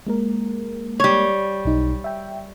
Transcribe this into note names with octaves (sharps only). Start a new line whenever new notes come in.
G#3 A#3 A#4
G3 C#5
B1 D#4
E5 G5